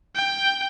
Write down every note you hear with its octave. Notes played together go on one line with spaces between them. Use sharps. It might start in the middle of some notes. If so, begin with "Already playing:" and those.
G5